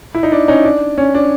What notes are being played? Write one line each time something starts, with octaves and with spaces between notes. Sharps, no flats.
E4
D#4
D4
C#4 D#4
D4
C#4
D4